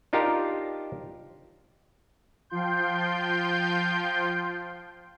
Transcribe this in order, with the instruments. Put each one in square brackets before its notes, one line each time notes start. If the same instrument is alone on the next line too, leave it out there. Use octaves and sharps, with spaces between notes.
[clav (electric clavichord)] D4 D#4 F4 G4 A#4 A5
[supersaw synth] F3 F4 G5 C6 G6